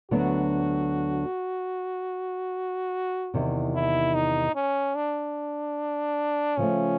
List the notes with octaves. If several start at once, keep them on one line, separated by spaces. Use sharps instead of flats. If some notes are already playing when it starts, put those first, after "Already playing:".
D2 D3 F#3 B3 D4 F#4
E2 C3 D#3
E4
D#4
C#4
D4
C#3 F3 A3 C#4